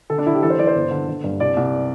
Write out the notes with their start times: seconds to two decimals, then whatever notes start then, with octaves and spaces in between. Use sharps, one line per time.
0.10 D3 A4
0.18 D4
0.26 D3 E4
0.34 G4
0.43 E3 A4
0.50 C5
0.59 E3 D5
0.67 C5
0.75 G1
0.91 D3
1.08 D3
1.24 G2
1.40 C2 D5
1.57 C2